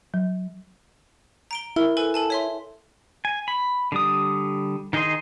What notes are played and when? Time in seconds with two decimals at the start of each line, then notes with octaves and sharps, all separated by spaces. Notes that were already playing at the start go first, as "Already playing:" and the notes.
0.14 F#3
1.51 A#5 D7 G7
1.76 E4 A#4
1.97 A4 B4 G#5
2.14 A4 G#5 A5
2.30 C#5 E5 C6
3.25 G#5
3.48 B5
3.92 D3 G3 D#6
4.93 D#3 D#4 G#4 D#5 C6